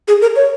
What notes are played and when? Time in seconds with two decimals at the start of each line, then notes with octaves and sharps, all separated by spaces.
0.08 G#4
0.21 A#4
0.36 C#5